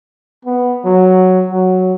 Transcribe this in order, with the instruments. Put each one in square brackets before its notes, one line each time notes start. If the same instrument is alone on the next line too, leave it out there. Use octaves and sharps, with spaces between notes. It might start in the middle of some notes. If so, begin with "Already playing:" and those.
[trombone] B3
F#3
F#3